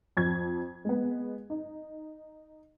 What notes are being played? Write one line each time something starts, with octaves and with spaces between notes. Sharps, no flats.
F2 G#6
G#3 B3
D#4